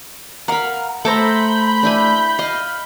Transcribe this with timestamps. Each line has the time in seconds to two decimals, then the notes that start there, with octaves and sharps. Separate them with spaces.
0.48 A#4 F5 F#5 B5
1.05 A3 A4 C5 E5 A#5 B5 D6 G6
1.83 D4 E4 G#5
2.39 D#5 F5